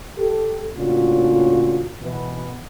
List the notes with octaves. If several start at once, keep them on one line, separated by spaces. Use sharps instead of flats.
G4 A4
A2 C#3 A#3 D4 F4 F#4
B2 E3 B3